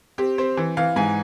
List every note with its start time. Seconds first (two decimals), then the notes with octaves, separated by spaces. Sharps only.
0.18 C4 G4
0.38 C4 C5
0.57 E3
0.77 E3 F5
0.96 G#2 G#5